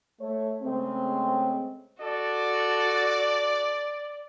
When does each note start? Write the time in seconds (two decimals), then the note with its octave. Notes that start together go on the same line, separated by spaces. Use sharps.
0.21 A3 C#5
0.63 C#3 G#3 A3 C4
2.01 F#4 A4 D5